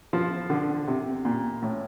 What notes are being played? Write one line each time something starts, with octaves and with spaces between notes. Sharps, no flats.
F3
D3
C3
A#2
A2